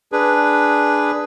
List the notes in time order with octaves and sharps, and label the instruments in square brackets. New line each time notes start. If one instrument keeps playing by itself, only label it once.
[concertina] D4 G#4 B4